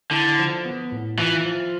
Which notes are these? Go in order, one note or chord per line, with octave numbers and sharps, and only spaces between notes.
D3 E4
F3
B3
A2
E3 F4
F3